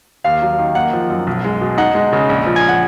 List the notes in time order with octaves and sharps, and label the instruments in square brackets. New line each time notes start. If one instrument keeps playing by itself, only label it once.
[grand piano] D#2 [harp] F5
[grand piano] F#3
D#3
[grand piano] A#3 [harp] F#5
[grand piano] F3
F#2
B1
G#3
B2
[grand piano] D#4 [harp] F#5
[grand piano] G#3
C#3
A#1
F3
[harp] G#5
F#5